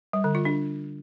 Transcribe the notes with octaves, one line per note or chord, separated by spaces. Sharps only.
G3
D3
F4
D4